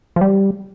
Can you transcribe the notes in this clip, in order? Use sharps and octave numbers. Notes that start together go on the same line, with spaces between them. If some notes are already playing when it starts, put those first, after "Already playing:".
F3
G3